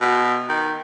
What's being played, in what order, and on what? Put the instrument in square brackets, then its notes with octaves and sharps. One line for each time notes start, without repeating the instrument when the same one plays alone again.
[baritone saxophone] B2
D#3